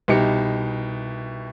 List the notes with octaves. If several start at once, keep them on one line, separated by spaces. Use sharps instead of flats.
C2 B2 D#4 G4 C#7